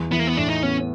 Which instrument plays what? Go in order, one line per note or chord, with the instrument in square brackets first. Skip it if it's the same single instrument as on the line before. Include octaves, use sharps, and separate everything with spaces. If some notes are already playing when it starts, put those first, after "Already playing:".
Already playing: [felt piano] E2
[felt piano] E3 [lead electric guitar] B3
[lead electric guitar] A#3
B3
[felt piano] A2 [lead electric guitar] D4
[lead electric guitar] D#4
[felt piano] B3 [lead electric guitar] C#4